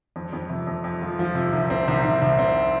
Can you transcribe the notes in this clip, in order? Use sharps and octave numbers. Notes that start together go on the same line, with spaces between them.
F2
F2
C3
F2
F2
F3
F3
C3
C2
C4
C2
C2
C2
C4